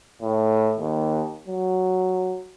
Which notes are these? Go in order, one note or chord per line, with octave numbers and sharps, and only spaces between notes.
A2
D#2
F#3